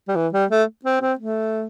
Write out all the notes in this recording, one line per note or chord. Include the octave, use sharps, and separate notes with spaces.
G3
E3
G3
A3
C4
C4
A3